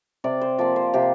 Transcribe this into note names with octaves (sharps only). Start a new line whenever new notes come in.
C3 D5
C5
F3 A#3 D5
C5
C3 G4